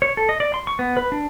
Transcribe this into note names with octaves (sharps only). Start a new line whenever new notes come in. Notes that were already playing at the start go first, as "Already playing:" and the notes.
C#5
A4
D#5
D5
C6
C#6
B3
B4
D4